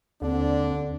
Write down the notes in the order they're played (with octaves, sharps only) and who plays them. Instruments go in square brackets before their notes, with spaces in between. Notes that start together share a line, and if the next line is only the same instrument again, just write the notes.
[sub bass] D#2 [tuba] D3 [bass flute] C4 [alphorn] D4